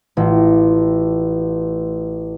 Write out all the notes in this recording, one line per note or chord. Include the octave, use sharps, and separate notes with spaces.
A1 F4